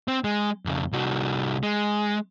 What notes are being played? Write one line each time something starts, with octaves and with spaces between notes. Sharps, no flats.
C4
G#3
F2 C#3
C2 F#4
G#3